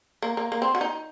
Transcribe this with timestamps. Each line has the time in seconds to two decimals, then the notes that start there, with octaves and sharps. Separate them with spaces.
0.22 A#3
0.37 A#3
0.52 A#3
0.62 C4
0.75 F#4
0.81 D#4